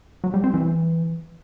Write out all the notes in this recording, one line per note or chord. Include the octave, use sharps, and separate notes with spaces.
F#3
G3
C4
E3